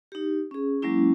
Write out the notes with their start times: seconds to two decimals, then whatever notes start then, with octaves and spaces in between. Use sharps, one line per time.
0.12 D#4 G4
0.51 C#4 G#4
0.82 F#3 G#3 A#3 C#4 E4